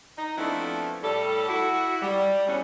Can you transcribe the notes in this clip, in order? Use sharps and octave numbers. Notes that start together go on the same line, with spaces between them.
D#4
F3 A3 B3 C4 D4 E4
A2 G3 A4
E4 F#4
G3
E2 A2 F#3 G3 C#4